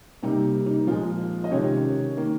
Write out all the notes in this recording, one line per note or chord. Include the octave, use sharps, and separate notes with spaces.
C3 G3 A#3 D#4
D#4
A#2 F3 G#3 F4
D#5
C3 D#3 G#3 C#4 C#5
D#3 A#3